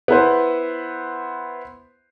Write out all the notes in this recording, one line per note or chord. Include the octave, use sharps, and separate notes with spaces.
B3 E4 B4 C5